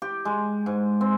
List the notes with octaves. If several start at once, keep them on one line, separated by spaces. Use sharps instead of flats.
G4
G#3
G#2
C4